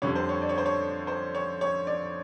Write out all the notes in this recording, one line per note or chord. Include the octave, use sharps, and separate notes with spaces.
F2 D3 G3 C#5
C5
C#5
D5
C#5
C5
C#5
C5
C#5
C#5
D5